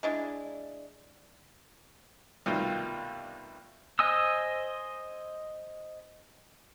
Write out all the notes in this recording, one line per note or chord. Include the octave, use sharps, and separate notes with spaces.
G#3 D4 E4
C2 B2 D#3 G3 A3 F4
C5 D#5 G#5 D#6 E6